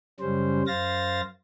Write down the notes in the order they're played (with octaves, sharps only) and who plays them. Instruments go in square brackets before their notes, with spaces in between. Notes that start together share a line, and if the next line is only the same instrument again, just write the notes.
[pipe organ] F#2 C#3 G3 C#4 C5
F#2 C5 F5 A6 A#6